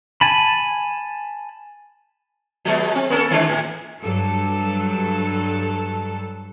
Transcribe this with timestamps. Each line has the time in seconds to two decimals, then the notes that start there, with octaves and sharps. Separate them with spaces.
0.21 G#5 A5 B5
2.65 F3 G#3 B3
2.95 C4
3.10 A#3 C#4 A4
3.31 D#3 G#3 D4
3.48 A2
4.01 G2 F#3 A4